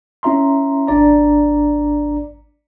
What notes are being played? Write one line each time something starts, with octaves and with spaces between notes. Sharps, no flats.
C#4 E4 E5 A#5 C6
G#1 D4 D5 A#5